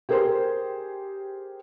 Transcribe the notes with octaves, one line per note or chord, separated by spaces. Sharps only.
G4 G#4 A#4 C5 G5 C6